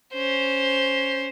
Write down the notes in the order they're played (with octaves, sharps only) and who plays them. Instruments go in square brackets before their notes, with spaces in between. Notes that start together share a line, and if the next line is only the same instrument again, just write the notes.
[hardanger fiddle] C#4 C5